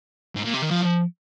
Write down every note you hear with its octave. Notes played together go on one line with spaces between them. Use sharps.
G#2
A#2
C3
D#3
F3